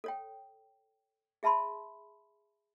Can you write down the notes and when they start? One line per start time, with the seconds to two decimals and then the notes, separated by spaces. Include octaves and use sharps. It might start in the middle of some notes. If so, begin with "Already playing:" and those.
0.04 A4 C#5 G5
1.43 G#4 E5 A5 B5 C6